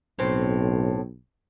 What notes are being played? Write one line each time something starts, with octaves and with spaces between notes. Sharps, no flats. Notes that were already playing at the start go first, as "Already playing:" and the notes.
B1 A2 C4